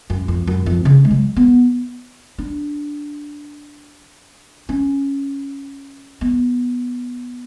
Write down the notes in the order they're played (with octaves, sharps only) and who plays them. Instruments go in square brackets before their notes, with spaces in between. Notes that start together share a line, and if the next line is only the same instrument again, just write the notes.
[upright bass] F#2
F2
F#2
F2
C#3
G#3
F#3
B3
D4
C#4
B3